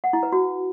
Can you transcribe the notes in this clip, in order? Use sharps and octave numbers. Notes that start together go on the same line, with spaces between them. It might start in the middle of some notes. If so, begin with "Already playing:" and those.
F#5
E4
B4
F#4